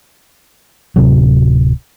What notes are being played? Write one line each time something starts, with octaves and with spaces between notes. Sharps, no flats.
D1 C3 F#3